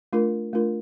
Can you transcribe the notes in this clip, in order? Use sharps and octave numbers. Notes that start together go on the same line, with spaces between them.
A3 D4 F4 A#4
A3 D4 F4 A#4